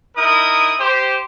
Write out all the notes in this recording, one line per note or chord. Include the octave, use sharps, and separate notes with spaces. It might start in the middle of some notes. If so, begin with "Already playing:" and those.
D#4 E4 A#4 D#6
G4 C5